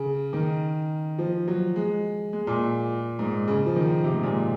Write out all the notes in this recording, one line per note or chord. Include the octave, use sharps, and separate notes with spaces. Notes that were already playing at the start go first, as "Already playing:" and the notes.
Already playing: C#3
D#3
F3
F#3
G#3
G#3
A#2
G#2
C#3
F3
D#3
C3
G#2
A#2